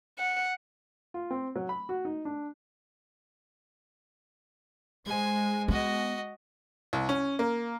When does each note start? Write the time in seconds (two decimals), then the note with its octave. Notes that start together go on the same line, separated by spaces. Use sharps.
0.19 F#5
1.14 F4
1.31 C4
1.56 F#3
1.69 B5
1.89 F#4
2.05 D#4
2.25 D4
5.06 G#3 C5 G#5
5.68 B3 F#4 D#5
6.93 C2
7.09 C#4
7.39 A#3